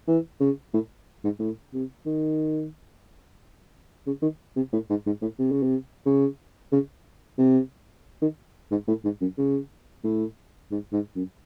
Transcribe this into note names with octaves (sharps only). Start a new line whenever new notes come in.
E3
C#3
A2
G#2
A2
C3
D#3
C#3
D#3
C3
A2
G#2
G#2
A2
C3
C#3
C3
C#3
C#3
C3
D#3
G#2
A2
G#2
F#2
C#3
A2
G#2
G#2
F#2